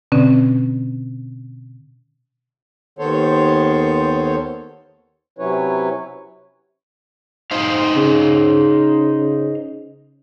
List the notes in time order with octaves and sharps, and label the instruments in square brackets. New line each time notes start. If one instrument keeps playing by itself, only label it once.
[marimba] B2 D3 C4 C#4
[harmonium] D#2 D#3 B3 A4 C5 C#5
C3 F#3 C#4 E4 B4 C#5
[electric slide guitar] D#4 C5 F5
[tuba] C#3